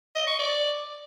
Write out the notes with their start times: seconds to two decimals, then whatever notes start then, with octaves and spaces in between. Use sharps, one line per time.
0.15 D#5
0.27 C#6
0.39 D5